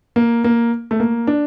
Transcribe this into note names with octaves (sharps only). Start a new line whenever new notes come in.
A#3
A#3
A3
A#3
D4